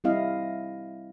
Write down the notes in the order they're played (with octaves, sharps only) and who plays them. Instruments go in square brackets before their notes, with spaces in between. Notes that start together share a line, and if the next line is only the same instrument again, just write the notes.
[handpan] G3 C4 E4 D#5 F5